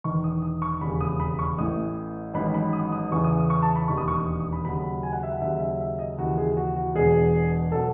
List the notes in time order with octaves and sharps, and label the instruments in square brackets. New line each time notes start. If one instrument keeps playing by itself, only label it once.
[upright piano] E1 E2 D#3 C#6
D#6
D#6
C#6
E1 D#2 C#3 B5
D#6
B5
C#6
A1 A2 E3 D#6
A1 G#2 D#3 F#3 B5
B5
D#6
D#6
E2 C#3 E3 C#6
D#6
D#6
C#6
A5
B5
E1 D#2 D#3 C#6
D#6
C#6
D#6
D#6
B5
D#2 C#3 F#3 B5
G#5
F#5
E5
F#5
D#2 C#3 F#3 E5
E5
E5
D#5
D#2 C#3 E3 F#4
G#4
F#4
F#4
E1 E2 B2 G#4
B2 F#3 A4